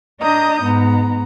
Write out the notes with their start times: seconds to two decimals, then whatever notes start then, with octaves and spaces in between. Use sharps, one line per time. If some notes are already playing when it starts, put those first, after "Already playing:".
0.21 D4 D#5 A#5 D#6 G6
0.62 G#2 B3 A#5